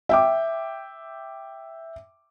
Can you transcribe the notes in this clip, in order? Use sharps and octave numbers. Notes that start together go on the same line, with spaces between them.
E5 G5 D6